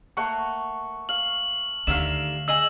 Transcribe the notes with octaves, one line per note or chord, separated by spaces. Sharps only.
A3 A#3 F#5 C#6
F5 F#7
D2 D3 D#3 G4 E5 F5 E7
G#4 D#5 G#5 E6 F#7